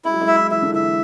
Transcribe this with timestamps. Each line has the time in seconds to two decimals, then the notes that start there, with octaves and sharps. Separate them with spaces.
0.05 G#3 E4
0.13 F#3
0.21 G#3
0.28 E5
0.51 E3 E5
0.62 D3
0.72 E3 E5